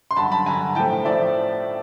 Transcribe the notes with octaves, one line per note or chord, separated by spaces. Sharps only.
C6
G2 D3 F#3 A5 B5
A5 B5
G2 D3 F#3 G#5 A#5
A2 F3 A3 G5 A5
A2 F3 A3 D5 E5